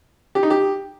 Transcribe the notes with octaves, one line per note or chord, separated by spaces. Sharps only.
G4
D#4
G4